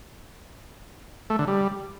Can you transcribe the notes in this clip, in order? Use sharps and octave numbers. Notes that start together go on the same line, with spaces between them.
A3
D3
G3